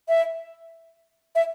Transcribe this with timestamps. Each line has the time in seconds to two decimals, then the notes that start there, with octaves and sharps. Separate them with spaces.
0.09 E5
1.35 E5